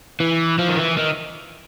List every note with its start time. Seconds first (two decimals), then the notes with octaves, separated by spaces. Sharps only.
0.20 E3
0.58 F3
0.68 D#3
0.77 E3
0.97 D#3